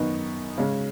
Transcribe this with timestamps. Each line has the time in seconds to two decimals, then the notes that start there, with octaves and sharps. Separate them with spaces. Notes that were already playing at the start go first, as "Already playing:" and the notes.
Already playing: F#2 D#3 B3 D#4 C#6
0.58 C#3 G#3 C#4